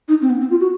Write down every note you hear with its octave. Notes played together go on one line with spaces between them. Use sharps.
D#4
C4
B3
C4
F4
F#4